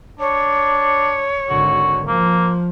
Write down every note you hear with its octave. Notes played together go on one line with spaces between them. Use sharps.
D4 C#5
G#1 D3 F#4
F3 A#3